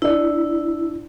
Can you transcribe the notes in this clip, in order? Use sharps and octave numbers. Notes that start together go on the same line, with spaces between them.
D4 E4 D5